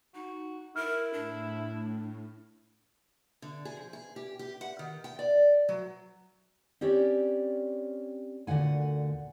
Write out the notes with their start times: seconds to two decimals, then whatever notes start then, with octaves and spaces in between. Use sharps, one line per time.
0.15 D#4 F#4
0.76 E4 A#4 F6
1.13 A2 D4
3.42 D3
3.65 G#4
3.77 F3
3.93 G#4
4.16 G4
4.39 G4
4.61 F#5
4.79 D#3
5.04 G5
5.19 D5
5.69 F#3
6.81 C4 C#4 G4 C#5 D5
8.47 D2 A#2 D3 F#5 G#5